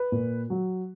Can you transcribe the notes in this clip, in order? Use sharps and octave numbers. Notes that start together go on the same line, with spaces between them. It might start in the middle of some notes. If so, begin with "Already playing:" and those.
Already playing: B4
A#2
F#3